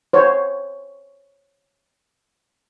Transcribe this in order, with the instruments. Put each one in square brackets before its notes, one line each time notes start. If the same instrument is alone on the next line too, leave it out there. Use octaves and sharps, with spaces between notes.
[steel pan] C5 C#5